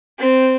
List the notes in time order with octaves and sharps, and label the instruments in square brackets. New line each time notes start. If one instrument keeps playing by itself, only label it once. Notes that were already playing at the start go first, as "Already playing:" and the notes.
[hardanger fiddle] C4